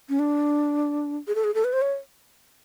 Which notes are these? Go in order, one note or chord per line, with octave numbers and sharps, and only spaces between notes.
C#4
D4
G#4
A4
G#4
A4
B4
C5
C#5